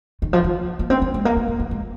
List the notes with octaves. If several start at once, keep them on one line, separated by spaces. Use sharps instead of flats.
D#3
F3
D#3
A#3
C4
A#3
G#3
A#3
A#3
A#3
A#3
G#3